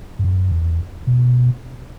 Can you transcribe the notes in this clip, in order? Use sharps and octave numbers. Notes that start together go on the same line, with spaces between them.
G2
F#2
E2
B2